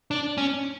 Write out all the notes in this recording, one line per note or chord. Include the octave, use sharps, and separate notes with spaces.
D4
C#4